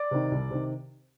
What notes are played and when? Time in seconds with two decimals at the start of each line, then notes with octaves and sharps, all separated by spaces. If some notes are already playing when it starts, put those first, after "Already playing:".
Already playing: D5
0.11 C3 D#3
0.31 C2
0.50 C3 D#3